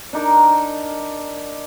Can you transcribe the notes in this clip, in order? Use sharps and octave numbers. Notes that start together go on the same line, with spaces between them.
D4 D#4 A#4